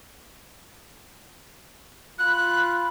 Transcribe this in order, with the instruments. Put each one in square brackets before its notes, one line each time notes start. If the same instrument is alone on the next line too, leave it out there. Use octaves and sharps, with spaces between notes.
[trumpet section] F4 B5 [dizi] F#6